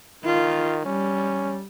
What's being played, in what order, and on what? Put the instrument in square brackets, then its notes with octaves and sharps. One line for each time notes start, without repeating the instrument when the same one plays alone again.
[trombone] D#3 [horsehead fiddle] F4
[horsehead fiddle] G3 [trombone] C#4